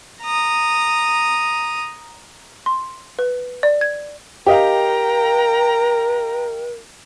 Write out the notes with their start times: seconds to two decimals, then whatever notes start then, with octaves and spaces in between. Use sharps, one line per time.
0.22 A#5 D#6
2.66 C6
3.19 B4
3.63 D5
3.81 G#6
4.47 G4 A#4 D#5 F5 G5 A#5